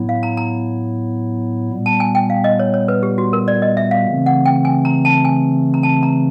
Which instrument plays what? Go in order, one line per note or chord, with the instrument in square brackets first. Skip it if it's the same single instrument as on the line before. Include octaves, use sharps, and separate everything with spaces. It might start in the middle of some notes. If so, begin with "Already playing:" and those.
Already playing: [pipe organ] A2 F#3 B3 E4
[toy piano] F5
A#5
A#5
[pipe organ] A#2 G3 B3
[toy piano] A5
G#5
G5
F5
D#5
C#5
C#5
B4
G4
F#4
A#4
D5
D#5
E5
F5
[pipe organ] C#3 E3 A3 C4
[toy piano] F#5
G5
G#5
A#5
A5
G#5
A#5
A5
A#5